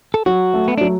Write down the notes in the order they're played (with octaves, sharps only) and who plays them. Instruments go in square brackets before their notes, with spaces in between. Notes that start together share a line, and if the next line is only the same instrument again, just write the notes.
[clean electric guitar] A4
[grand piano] F#3 [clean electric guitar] F#4
[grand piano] A3
[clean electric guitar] B3
[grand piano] F#3 [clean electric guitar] D4